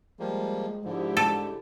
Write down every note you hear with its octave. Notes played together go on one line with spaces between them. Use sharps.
F3 G3 G#3 A#3
G#2 D3 F3 G#3 E4 G4
A4